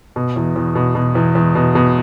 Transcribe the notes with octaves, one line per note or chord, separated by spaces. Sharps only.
B2
E2
E2
B2
B2
E2
E2
B2
B2